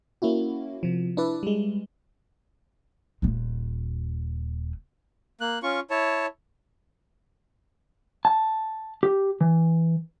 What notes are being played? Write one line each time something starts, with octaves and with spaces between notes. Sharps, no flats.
A#3 C#4 E4 F#4
C3 F3
D4 E4 B4 D5 E5
G3 G#3
D#1 A#2
A#3 F#6
C#4 F4 C#6
E4 C#5 A5
A5
G4
E3